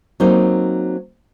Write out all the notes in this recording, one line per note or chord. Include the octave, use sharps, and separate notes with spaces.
F#3 A#3 C4 D#4